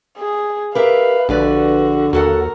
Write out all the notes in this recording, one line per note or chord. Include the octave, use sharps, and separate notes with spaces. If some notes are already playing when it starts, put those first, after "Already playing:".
G#4
G4 A#4 B4 E5 F5
A#1 D3 F#4 G4 B4 D5
D#2 F#4 A4 A#4 F#5